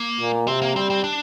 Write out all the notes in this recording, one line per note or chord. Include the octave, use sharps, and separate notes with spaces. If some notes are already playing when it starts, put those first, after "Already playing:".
Already playing: A#3
A#2
C3 C4
A#3
G3 C4
C4
D4